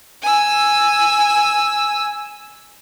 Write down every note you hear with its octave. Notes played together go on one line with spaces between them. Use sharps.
G#5 E6